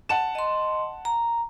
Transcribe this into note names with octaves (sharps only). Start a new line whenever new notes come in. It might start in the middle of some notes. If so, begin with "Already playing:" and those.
F#5 A5 E7
D#5 C6
A#5